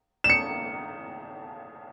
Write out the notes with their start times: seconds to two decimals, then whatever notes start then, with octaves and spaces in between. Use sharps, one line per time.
0.24 E7
0.30 C#7